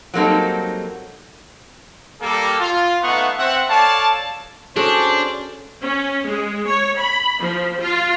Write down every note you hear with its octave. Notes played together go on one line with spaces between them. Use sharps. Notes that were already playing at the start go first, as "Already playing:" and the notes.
F#3 G3 A#3 C4 D#4 A4
G3 A#3 A4
F4
A3 B3 D#4 F5 F#5 C#6
C4 E5 F#5
A4 C#5 D5 F5 A5
C#4 D4 F#4 G#4 A4 C5
C#4
G#3
C#5
B5
F3
F4